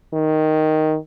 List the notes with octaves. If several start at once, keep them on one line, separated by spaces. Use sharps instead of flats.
D#3